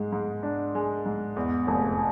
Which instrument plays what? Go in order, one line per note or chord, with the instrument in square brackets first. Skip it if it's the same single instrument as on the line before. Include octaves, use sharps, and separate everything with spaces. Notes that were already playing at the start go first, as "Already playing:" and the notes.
Already playing: [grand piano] G#2 G#3
G#2
D4
G#3
G#2
E2
F1